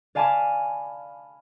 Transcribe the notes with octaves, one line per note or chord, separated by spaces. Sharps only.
D5 F5 G#5 A5 B5 D6